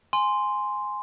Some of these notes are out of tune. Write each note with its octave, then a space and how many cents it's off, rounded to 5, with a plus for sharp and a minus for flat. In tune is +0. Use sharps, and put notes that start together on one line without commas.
G#5 +0 C6 -5